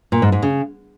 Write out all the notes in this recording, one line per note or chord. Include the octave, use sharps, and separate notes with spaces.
A#2
G#2
G#2
C#3